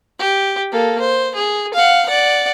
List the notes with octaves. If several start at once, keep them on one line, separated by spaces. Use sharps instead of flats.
G4
A#3 A4
C5
G#4
F5 F#5
D5 F#5